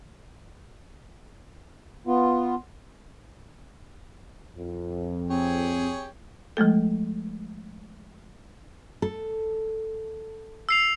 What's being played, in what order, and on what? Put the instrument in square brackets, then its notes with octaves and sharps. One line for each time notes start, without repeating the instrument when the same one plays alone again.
[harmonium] B3 F4
[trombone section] F2
[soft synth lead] C4 [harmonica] G4 G#4 C#5
[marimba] F3 G#3 A3 A4
[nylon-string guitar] A4
[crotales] E6 C7 F7